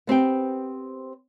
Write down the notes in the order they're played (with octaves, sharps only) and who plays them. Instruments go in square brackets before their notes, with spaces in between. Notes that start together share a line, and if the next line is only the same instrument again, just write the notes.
[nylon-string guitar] B3 C4 G4 G5